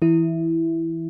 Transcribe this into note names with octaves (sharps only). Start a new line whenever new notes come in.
E3 E4